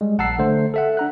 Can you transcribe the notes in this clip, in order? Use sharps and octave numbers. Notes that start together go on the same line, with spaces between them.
G3 G#3
A#1 F#5 A5 A#5 E6 C7
D3 A3 C5
A4 E5 F#5
D4 A#5 F#6